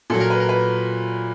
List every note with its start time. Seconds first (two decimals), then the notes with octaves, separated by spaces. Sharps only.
0.10 A#2 A4
0.14 F#3
0.20 A#4
0.30 B4
0.40 A#4
0.49 B4